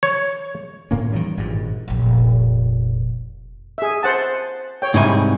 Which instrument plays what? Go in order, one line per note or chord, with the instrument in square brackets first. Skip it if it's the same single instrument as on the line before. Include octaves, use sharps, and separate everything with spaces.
[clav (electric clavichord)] C#5
[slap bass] A2 A#3 C#4
D#3 E3 F#3 G3
G#1 G2 A#2
[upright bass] F1 A#1
[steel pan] G#4 E5
C5 F#5 A5
C#5 G5
[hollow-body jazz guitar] C2 G#2 [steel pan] E4 G#5